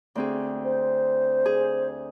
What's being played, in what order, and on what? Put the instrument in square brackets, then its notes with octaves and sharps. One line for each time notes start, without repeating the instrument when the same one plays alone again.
[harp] D2 C4 G#4
[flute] C5
[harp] G#4